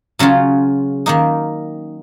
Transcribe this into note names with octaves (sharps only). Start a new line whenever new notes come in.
C#3 F#3 C#4 F4
D#3 A#3 D#4